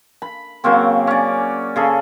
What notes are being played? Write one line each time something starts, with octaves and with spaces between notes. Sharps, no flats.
B5
C#3 F#3 A#3 C4
C#4 D5
C#3 G#4 A4